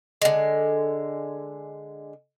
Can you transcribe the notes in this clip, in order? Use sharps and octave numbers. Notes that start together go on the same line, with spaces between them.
D3 G#3